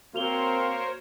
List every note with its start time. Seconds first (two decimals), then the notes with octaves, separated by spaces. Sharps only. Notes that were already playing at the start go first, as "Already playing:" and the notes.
0.14 A#3 C4 F#4 A#4 C5 C#5 F7 G7